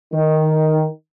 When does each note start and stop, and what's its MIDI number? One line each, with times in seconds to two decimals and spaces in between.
0.13 0.86 51